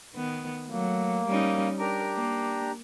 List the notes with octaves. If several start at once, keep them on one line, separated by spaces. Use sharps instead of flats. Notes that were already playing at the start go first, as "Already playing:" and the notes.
D#3 B3
F#3 A3 A#3
G3 C#4 D#4
D4 G4 A#4 A#5
A#3